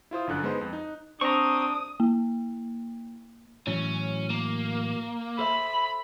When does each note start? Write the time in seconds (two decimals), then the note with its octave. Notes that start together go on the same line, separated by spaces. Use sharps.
0.11 E4 F4 C5 D#6
0.27 G1 F#2 D3 F#6
0.43 G#3 B3 D#4 B4 C5
0.61 F2
0.73 D#4
1.21 C4 D4 A#5 C#6 D#6
2.00 A#3
3.67 A2 E3 F#3 C#4
4.30 A#3
5.39 A4 C5 E5 B5